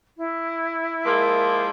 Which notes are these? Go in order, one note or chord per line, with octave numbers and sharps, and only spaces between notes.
E4
F3 G#3 A#3